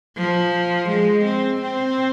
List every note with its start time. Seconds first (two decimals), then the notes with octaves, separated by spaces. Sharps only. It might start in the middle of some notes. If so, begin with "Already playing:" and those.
0.17 F3
0.89 G#3
1.25 C4
1.62 C4